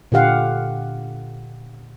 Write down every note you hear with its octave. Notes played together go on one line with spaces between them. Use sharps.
A#2 D3 G4 F5 F#5